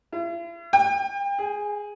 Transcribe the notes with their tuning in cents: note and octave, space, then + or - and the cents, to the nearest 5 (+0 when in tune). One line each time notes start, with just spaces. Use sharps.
E4 +45
G5 +35
G#4 -5